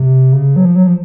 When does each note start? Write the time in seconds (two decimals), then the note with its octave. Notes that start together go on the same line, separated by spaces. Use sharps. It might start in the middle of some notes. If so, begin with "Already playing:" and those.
Already playing: C3
0.33 C#3
0.56 F#3
0.65 F3
0.76 F#3
0.87 F3